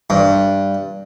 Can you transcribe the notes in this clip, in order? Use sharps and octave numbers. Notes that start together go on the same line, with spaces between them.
G2